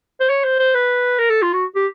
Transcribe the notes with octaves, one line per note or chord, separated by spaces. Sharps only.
C5
C#5
C5
C5
B4
A#4
A4
F4
F#4
G4